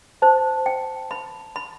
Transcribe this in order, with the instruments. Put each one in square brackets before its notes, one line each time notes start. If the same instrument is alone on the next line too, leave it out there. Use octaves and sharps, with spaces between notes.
[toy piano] C5 [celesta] A5
[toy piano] G5
B5
B5